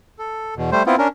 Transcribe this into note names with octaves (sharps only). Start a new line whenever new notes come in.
A4
E2 B2
G3 A3 C5
B3 C4 E4 F4
C#4 D4 A#4